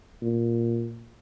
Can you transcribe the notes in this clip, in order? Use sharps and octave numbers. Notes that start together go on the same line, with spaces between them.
A#2